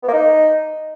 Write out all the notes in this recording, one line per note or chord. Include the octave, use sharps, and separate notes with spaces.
B3
A#3
D#4